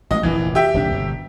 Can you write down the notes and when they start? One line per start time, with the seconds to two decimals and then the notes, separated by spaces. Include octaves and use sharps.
0.11 A1 G#3 D#5
0.23 F1 A#1 A#2 E3
0.55 G4 E5 G5
0.74 D#1 C2 D4
0.92 G1 B2